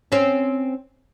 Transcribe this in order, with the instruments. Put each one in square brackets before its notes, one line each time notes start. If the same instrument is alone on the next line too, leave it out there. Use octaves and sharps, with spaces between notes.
[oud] C4 C#4